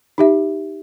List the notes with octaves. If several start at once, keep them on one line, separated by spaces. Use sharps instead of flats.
D#4 G4 E5